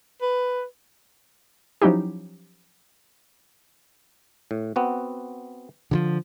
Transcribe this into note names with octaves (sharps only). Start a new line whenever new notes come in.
B4
F3 F#3 C#4 D#4 E4 G4
A2
B3 C4 F#4
D3 E3 F3